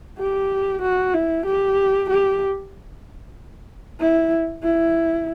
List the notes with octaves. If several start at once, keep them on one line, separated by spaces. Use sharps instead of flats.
G4
F#4
E4
G4
G4
E4
E4